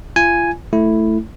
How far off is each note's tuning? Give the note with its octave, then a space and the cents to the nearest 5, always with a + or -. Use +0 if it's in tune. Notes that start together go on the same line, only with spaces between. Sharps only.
F4 -40 G#5 +0
A3 +0 E4 +0